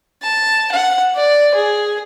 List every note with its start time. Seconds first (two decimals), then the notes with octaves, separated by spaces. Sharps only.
0.22 A5
0.72 F#5
1.15 D5
1.54 G#4